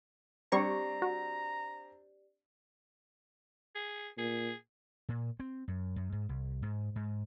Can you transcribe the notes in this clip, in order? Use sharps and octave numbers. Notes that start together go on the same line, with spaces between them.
G3 C4 D4 G4 D5 A#5 C#6
F#4
G#4
A#2 G#4
A#2
C4
F#2
F#2
G#2
C2
G#2
G#2